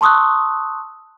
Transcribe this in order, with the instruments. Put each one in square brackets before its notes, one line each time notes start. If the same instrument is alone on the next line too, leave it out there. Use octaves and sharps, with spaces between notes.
[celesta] A5 C6 C#6 D#6 E6 F#6